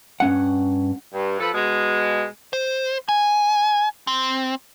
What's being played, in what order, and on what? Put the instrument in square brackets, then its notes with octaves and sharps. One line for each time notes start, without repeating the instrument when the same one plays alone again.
[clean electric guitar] G2 C#4 F#5
[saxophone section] G2
F3 A4 B4
B2 G#3
[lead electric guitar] C5
G#5
C4